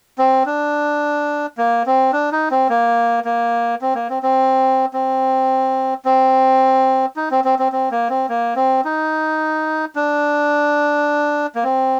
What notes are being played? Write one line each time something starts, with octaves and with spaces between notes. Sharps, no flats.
C4
D4
A#3
C4
D4
D#4
C4
A#3
A#3
C4
A#3
C4
C4
C4
C4
D#4
C4
C4
C4
C4
A#3
C4
A#3
C4
D#4
D4
A#3
C4